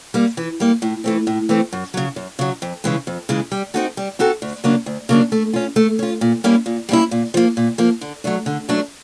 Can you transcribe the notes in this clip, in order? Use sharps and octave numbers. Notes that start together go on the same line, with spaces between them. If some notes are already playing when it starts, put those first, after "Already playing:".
G3 A#3
E3
G3 A#3
A2
E3 A3 C4
A2
E3 A3 C4
F#2
C#3 F#3
F#2
C#3 F#3
F2
C#3 E3 G#3
F2
C#3 E3 G#3
G3
C4 D#4 F#4 A4
G3
C4 D#4 F#4 A4
D2
C#3 F#3 A#3 D4
D2
C#3 F#3 A#3 D4
A3
C#4 F4
A3
C#4 F4
A#2
G3 A#3 C#4 E4
A#2
G3 A#3 C#4 E4
A#2
F3 A#3
A#2
F3 A#3
D3
F#3 A3 D4
D3
F#3 A3 D4